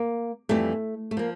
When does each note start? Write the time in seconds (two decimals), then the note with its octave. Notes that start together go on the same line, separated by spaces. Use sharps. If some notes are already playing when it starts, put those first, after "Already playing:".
Already playing: A#3
0.49 F2 E3 G3 A3
1.11 A3
1.17 F3 A#3